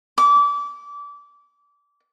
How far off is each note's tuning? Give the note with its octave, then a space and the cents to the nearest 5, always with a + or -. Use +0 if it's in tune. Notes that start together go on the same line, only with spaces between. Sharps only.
D6 -25